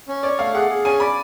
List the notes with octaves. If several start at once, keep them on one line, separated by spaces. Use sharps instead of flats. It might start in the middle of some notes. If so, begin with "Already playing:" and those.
C#4
C#5 D5
A3 F5
G#4 F#5
G#4
C#4 G#5
D5 B5